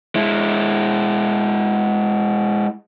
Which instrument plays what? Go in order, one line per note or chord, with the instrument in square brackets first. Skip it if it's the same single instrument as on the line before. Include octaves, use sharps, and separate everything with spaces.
[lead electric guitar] G#3 E4